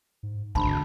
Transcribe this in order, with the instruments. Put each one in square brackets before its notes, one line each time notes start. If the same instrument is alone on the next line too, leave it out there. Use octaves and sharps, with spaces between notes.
[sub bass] G#2
[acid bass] G#1 [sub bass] D2 [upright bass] D3 [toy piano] A5 B5 C6